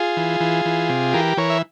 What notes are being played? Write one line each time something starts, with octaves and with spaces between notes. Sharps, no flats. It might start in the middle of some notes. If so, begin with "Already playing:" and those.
Already playing: F4 G#4
E3
E3
E3
C3
E3 G4 A#4
E3 A#4 C#5
E5